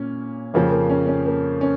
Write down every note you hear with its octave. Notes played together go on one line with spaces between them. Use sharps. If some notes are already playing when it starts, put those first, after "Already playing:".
Already playing: A#2 A#3 C#4
F2 C#3 F3 A#3
A#3
C#4
C#4
A#3
C#4